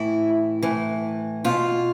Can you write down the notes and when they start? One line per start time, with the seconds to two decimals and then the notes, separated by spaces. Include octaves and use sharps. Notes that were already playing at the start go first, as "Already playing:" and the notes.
Already playing: A2 E3 E4
0.62 A2 E3
1.44 B2 F4